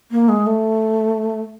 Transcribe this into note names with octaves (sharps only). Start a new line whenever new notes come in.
A#3
G#3
A3